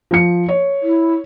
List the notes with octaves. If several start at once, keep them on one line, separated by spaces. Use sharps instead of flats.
F3 C#7
C#5
E4